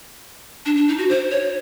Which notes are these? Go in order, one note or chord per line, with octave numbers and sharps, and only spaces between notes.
D4
D4
D#4
F#4
C5
C#5